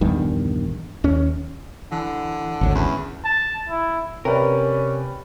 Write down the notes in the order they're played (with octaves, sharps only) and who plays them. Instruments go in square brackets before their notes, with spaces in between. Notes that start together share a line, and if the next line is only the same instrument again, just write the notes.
[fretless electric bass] A#1 E2 G2 D#3
D#2 C#4
[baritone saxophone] D3 [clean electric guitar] E3
[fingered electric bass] G#1 D2 [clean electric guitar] A4 C#5
[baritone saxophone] E2 [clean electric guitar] C#4 E4
[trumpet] A5
E4
[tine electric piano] C3 [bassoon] C#4 [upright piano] G4 B4 D5 [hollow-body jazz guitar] A#4